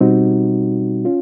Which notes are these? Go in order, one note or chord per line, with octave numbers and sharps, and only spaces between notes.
B2 G3 C4 D#4 F#4
C#4 F4